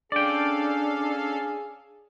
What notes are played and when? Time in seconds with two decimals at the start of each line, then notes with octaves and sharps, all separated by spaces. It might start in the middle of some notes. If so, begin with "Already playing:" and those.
0.12 C#4 D4 G#4 A4 D5 F5 G5